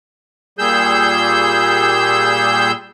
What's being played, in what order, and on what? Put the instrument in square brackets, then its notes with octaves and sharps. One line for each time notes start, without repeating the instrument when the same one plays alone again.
[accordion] A#2 G3 G#4 E6 G6